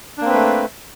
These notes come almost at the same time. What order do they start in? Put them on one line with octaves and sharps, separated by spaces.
D4 A#3 C4 B4 A3